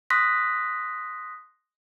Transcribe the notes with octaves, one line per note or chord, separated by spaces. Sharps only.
C6 D#6 F#6 A#6 B6